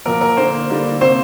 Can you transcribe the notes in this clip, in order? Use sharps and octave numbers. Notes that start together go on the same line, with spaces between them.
A#2 F3 A#3 A#4
A#4
D3 A#3 C5
D3 G3 A#3
C3 A#3 C5